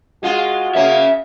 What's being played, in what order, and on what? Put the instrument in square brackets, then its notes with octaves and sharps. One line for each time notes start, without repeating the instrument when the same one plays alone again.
[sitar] G#3 F4 [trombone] F#4
[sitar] C#3 A#3 C#4 [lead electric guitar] E5